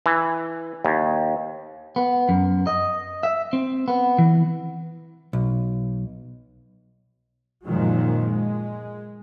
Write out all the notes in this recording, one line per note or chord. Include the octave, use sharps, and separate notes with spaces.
E3
D#2
B3
F#2
D#5
E5
C4
B3
E3
B1
F#2 A#2 D#3 F3 F#3 G#3
G#3